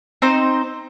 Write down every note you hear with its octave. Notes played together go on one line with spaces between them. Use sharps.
C4 D#4 C5